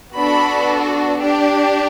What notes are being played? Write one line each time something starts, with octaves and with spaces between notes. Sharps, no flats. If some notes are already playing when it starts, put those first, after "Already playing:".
B3 D4 F#4 A4 B5
D4 G4